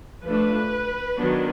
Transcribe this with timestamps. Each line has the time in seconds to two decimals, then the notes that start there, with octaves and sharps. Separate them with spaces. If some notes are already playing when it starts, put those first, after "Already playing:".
0.24 F3 A3 D4 B4
1.16 D#3 F#3 B3 D4